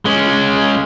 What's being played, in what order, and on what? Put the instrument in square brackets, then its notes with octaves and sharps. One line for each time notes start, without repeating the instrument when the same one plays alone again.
[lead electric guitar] G#3 C#4